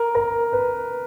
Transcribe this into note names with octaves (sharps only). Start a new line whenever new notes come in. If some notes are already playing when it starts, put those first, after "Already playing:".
Already playing: A#4
A#4
B4